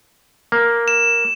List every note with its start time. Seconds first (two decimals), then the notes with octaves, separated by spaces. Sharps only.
0.52 A#3
0.88 E7